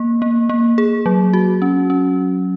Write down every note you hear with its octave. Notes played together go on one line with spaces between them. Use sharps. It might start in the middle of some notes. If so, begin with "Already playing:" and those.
Already playing: A#3
A#3
A#3
G#4
F#3
F#4
C#4
C#4